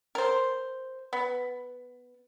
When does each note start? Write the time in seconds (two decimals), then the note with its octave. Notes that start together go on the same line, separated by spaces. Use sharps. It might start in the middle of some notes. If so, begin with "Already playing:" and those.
0.15 A#4 C5
1.13 B3